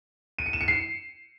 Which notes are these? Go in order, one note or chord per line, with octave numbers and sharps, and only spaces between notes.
D#7
C#7
E7
C#7
C7